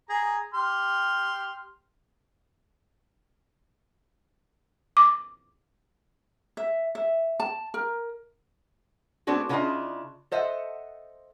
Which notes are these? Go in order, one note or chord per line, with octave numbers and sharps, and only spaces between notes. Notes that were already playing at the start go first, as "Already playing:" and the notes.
G#4 A#5
G4 C6 F6
D6
E5
E5
A5
A#4
A3 B3 C4 D4 F#4 G#4
C#3 B3 D4 E4 F4 D#5
A4 C5 D#5 E5 F#5